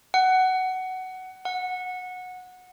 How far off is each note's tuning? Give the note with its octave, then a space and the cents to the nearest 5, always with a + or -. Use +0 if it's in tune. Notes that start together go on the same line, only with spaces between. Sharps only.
F#5 +15
F#5 -15